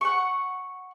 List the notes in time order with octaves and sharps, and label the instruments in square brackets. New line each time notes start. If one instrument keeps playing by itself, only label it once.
[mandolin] F#5 C#6